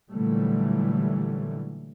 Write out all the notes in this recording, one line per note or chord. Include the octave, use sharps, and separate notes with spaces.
A#2 D3 E3 F#3 G3 A3